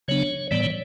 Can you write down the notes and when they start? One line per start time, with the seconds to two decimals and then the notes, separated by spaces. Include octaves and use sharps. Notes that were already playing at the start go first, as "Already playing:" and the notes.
0.08 C#3 F#3 B3 D4 C#5
0.51 A2 E3 G3 B3 D5
0.61 C#5